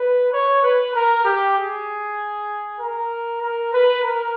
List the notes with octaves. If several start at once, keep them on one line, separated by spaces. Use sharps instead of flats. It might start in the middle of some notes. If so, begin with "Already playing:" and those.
Already playing: B4
C#5
B4
A#4
G4
G#4
A#4
A#4
B4
A#4